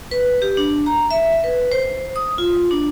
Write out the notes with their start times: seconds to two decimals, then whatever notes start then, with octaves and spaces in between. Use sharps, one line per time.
0.11 B4
0.42 G4
0.57 D4
0.86 A#5
1.11 E5
1.44 B4
1.72 C5
2.16 D#6
2.38 F4
2.71 D4